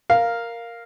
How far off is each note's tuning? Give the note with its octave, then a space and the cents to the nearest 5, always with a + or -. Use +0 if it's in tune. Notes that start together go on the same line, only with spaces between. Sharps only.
A#4 +0 F5 +0